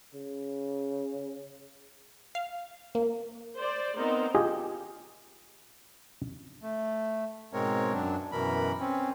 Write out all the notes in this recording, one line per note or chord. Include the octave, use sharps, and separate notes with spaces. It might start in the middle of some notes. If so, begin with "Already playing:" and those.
C#3
F5
A#3
C5 D5
B3 C4 D#4 A#4 C5
F4 G4 G#4 D#5
A3
G#2 B2 G#3 C4 A#4 C#5
F#2 F#3 D4
F#2 B2 E3 A#4 B5
C4 C#4